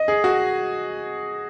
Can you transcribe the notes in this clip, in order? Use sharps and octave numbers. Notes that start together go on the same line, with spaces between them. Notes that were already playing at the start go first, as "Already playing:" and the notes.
Already playing: D#5
G#4
F#4